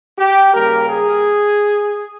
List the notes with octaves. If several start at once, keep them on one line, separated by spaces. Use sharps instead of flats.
G4
C#3 G3 A#3 A#4
G#4